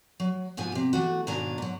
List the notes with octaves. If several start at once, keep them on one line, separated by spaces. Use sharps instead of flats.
F#3
G#2 B2 F3 G#5
C3 G4
E3 A3 F#4
D#2 G#2 B2 D4 G#5 A#5
G#2 F#3